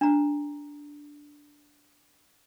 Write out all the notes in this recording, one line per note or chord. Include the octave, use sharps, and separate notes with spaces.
D4 A#5